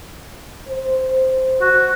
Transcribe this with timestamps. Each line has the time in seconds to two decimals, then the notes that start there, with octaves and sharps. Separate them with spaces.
0.68 C5
1.61 F#4